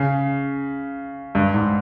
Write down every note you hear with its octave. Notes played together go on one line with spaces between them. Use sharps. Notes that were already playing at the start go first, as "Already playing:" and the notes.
Already playing: C#3
G2
G#2